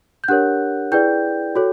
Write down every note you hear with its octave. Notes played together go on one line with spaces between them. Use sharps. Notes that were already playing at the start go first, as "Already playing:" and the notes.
G6
D4 G4 A#4 C#5 F#5 F#6
E4 G#4 B4 D5 G5 G6
F#4 A4 C#5